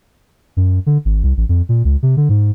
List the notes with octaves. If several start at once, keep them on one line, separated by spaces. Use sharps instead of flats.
F#2
D3
G#1
C2
A1
F2
A#2
C#2
C3
D3
G#2